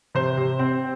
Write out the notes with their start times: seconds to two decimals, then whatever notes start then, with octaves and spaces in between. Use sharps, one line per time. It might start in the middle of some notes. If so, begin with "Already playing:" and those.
0.15 C3 C5
0.37 C3
0.59 C4